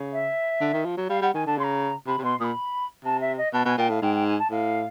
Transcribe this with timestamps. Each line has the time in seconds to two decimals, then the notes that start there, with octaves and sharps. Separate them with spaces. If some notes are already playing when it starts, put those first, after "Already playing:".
Already playing: C#3
0.12 E5
0.61 D3
0.74 D#3
0.85 F3
0.97 F#3
1.09 G3 F5
1.21 G3 F#5
1.34 D#3 G#5
1.46 D3 A5
1.58 C#3 C6
1.63 A#5
2.07 C3 B5
2.18 C3
2.23 B2 C6
2.40 A#2 B5 D#6
3.04 C3 A5
3.20 E5
3.37 D#5
3.53 B2 A5
3.65 B2 G#5
3.77 A#2 G5
3.89 A2 F5
4.02 G#2 G5
4.14 G5
4.26 G#5
4.38 A5
4.50 A2 F5